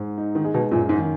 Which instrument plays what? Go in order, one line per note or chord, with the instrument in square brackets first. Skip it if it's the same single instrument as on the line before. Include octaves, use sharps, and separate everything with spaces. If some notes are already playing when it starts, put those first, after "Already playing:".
Already playing: [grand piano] G#2
D#4
[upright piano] D#3
[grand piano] G#3
[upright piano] B2
[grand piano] F#2 [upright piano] A#2
[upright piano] G#2
[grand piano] D#3